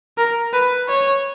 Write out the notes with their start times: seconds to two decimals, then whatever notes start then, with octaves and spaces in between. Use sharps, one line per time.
0.18 A#4
0.53 B4
0.88 C#5